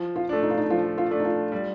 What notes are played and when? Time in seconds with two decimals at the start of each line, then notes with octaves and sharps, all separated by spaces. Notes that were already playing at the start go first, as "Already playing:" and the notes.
Already playing: F3
0.16 F4
0.29 A3 D4
0.43 D#4
0.50 F4
0.57 D#4
0.70 F3 F4
0.98 F4
1.11 A3 D4
1.20 D#4
1.24 F4
1.52 G3